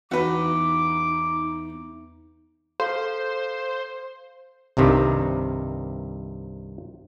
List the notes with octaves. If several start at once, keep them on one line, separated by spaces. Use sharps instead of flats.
E2 D#4 F#4 B4 D6
A4 C5 F5
C2 G2 C3 D#3